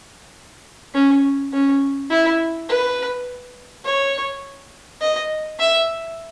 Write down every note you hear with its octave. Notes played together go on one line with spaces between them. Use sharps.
C#4
C#4
E4
B4
C#5
D#5
E5